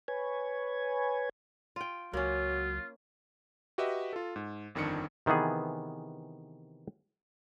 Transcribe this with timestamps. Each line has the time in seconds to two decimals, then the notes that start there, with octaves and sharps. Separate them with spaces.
0.08 B4 C#5 G#5
1.76 F4 G5
2.13 C#2 F#3 A#3 C#4 F4
3.78 F#4 G4 B4 D#5 E5
4.13 F4 A4
4.36 G#2
4.75 G1 F2 D#3 D4 C#7
5.26 C3 D#3 E3 B3 G#4